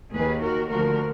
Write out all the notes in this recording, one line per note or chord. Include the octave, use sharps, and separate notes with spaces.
D#2 D#3 G#4 B4
F#4 A#4
D2 D3 F3 F#4 A#4